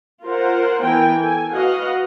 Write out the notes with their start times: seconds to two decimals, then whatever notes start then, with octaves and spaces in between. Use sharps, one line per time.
0.24 F4 A#4 C5 F#5
0.83 E3 B3 A#4 G5 G#5
1.20 A4 G#5
1.53 F#4 B4 D#5 F5 F#5